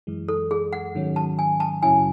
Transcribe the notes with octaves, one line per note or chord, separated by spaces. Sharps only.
F#2 E3 G#3
A4
G#4
F#5
G#2 D#3 F#3 C#4
A5
G#5
A5
F#2 C#3 F#3 C#4 E4 G#5